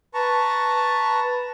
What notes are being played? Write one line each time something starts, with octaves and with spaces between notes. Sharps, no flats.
B4 A5 A#5 C#6